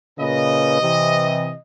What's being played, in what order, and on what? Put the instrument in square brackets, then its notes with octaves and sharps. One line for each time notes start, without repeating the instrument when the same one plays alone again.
[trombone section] A#2 C#3 B4 [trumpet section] D#5
[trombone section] C3 E3